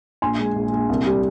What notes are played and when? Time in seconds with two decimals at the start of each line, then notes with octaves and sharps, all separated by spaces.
0.22 A#1 G#5 C6
0.39 G#3
0.56 A#1
0.73 A#1
0.89 C2
1.06 G3